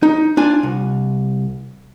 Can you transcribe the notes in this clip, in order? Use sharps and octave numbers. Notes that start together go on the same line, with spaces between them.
D#4
D4 F4 G#5
C2